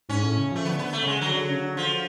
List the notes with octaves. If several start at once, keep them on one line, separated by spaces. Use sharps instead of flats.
G#2 C#4
A2
C#3
F3 A3
D3 B3
B3
A3
C#3 G#3
D3 F#3
D3
C#3
D3
F3